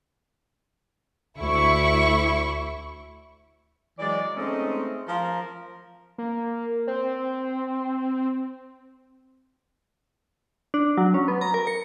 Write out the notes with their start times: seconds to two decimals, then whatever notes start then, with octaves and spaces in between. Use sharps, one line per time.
1.38 D2 E4 C#6
3.99 E3 F#3 G#3 D5
4.37 G#3 A3 C4 C#4 D#4 D#5
5.09 F3 F4 A#4
6.18 A#3
6.87 C4
10.74 D4
10.97 F#3
11.14 C#4
11.28 B3
11.41 A#5
11.54 A#4
11.67 C#7